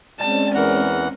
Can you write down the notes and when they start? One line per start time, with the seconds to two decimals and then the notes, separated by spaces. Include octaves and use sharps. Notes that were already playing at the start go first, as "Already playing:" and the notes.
0.20 G3 G#3 C4 C#4 A5
0.55 E2 E3 A#4 F#5